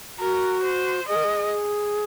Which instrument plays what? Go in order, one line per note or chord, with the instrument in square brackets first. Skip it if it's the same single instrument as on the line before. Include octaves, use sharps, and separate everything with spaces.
[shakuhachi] F#4 [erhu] A#4
[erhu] C5
[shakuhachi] G#4 [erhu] D#5
[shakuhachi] A#4
G#4